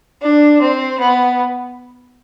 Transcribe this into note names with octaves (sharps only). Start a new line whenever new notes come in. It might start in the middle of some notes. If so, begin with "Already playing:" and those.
D4
C4
B3